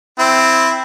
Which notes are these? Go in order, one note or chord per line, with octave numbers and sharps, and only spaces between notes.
C4 E4